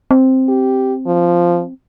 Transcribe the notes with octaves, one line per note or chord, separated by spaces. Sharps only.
C4
G4
F3